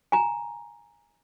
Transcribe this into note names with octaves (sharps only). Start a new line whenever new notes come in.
G#5 A#5